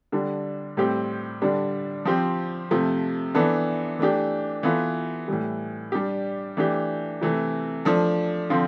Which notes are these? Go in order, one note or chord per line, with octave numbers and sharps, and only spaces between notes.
D3 G3 D4
A2 G3 C4 G4
D3 G3 D4
F3 C4 G4
C3 F3 A3
E3 B3 D4 A4
E3 A3 D4 G4
E3 B3 F4 A4
A2 E3 G3
G3 D4 G4
E3 A3 D4 G4
C3 E3 A3
F3 A3 D4 A4
D3 F3 C4 F4